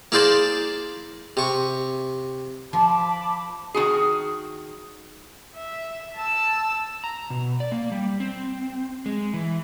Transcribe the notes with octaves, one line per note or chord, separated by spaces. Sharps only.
A#3 E4 G#4 C5 D5
C3 C#6
F3 A5 B5 D6
D#3 E4 F#4 G#4
E5
A5 E6
A#5
B2
D5
A#3
G3
C4
G#3
E3